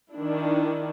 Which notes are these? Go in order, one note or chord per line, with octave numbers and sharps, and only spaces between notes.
D#3 D4 E4